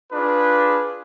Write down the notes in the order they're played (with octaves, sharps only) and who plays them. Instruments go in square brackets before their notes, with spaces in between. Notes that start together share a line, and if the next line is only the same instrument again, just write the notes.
[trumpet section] D4 F4 G#4 B4